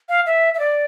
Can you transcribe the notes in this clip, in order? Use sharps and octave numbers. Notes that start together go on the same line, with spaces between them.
F5
E5
E5
D5